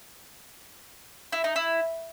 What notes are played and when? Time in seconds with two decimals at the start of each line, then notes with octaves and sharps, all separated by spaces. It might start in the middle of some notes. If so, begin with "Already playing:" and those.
1.32 E4
1.44 D#4
1.56 E4